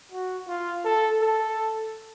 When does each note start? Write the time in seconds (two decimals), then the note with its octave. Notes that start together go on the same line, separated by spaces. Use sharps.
0.12 F#4
0.48 F4
0.85 A4
1.21 A4